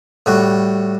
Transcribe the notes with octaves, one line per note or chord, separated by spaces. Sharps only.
A2 G3 F#4